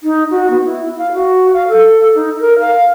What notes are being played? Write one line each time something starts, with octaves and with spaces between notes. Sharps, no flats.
D#4
F#4
B3
E4
F5
F#4
F5
A4
D#4
A#4
F5